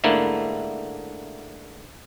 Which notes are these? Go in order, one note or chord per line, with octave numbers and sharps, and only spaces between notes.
G#2 D3 A3 A#3 E4